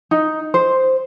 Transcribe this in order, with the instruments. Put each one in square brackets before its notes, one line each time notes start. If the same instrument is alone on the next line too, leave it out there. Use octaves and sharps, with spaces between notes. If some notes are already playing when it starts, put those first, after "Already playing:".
[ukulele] D#4
C5